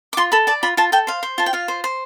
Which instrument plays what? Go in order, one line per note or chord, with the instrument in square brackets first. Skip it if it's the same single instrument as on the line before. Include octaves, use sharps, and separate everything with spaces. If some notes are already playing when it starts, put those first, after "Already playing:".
[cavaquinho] D6
F4 C6
A4 B5
D5 A5
F4 B5
F4 A5
A4 G5
C5 F5
C5
F4 A5
G5
F4 F5
C5
C5